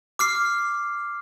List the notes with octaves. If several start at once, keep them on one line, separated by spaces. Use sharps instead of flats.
D6 F6 C7